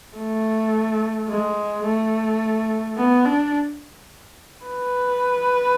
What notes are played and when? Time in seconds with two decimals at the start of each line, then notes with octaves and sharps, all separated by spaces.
0.17 A3
1.29 G#3
1.84 A3
2.97 B3
3.25 D4
4.65 B4